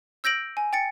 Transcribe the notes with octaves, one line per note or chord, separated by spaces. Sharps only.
E6 G6 A#6 D7 F#7
G#5
G5 A6 C#7